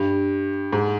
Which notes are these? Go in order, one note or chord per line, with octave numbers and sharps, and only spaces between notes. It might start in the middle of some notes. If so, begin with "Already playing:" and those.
Already playing: G2
G#2